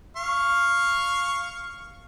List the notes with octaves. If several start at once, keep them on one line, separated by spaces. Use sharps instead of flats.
F5 C#6